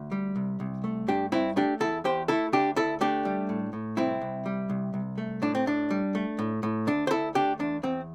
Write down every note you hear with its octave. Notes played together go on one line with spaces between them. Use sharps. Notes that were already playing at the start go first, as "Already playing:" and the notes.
Already playing: D2
G3
C2
C2
A3
G2 D4 G4
G2 C4 E4
A3 D4 G4
E2 E4 A4
E2 G4 C5
A3 E4 A4
D2 D4 G4
D2 E4 A4
A3 D4 G4
G3
A2
A2
C2 C4 E4
C2
G3
C2
C2
A3
A2 D4
C4
A2 D4
G3
A3
A2
A2
D2 D4
C5
D2 E4 A4
A3 D4 G4
E2 D4
E2 C4